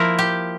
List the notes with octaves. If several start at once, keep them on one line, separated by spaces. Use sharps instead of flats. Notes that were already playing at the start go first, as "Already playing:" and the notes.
Already playing: F3 A#3 E4 A#4
G4